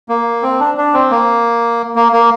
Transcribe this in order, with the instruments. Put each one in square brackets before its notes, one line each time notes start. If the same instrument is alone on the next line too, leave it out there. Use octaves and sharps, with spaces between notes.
[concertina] A#3
C4
D4
D4
C4
A#3
A#3
A#3